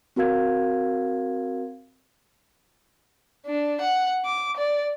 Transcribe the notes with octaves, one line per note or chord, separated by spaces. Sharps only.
C4 F#4 A#4 F5 G#6
D4
F#5
D6
D5